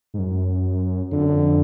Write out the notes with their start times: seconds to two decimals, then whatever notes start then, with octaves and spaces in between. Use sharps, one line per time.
0.14 G#2
0.19 F#2
1.12 F2 D3
1.22 F#2
1.33 F2